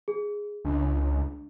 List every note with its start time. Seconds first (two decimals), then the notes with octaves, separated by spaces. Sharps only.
0.08 G#4
0.65 C#2 D4